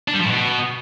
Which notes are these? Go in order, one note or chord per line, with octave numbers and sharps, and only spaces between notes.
D4
G3
F3
A2
B2